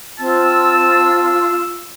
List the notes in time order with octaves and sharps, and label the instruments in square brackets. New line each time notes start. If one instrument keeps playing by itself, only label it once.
[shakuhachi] C4 [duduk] F4 [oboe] A5 [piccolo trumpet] E6